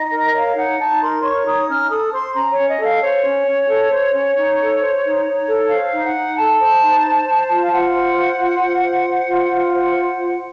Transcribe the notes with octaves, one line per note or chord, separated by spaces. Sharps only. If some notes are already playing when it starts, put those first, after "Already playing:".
Already playing: D#4 D#5
A#4
C#5 F5
D#4 F#5
D#4 A5
A#4 C6
C#5 C#6
D#4 D#6
C#4 F6
A4 D#6
C5 C6
C#4 A#5
C#5
C#4
D#5
A4
F5
C5 C#5
C#4
C#4
A4
C5
C#4
D#4
A4
C5
D#4
D#4
A4
C5 F5
D#4
F#5
D#4
A4 A5
C5
D#4
C5
C5
F4
F5
F4 F#5
C5
C5
F4
F4
C5
C5
F4
F4
C5 F#5
C5
F4